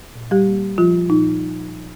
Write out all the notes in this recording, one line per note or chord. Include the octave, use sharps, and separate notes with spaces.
A#2
G3 G4
A#3
F3 F4
A#2 D#4